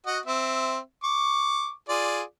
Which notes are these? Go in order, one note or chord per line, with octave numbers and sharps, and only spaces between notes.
F#4 D#5 F#5
C4 E5
C#6 D6
F4 G#4 D5